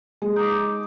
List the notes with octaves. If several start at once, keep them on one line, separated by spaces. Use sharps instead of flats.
G#3
D#4 D6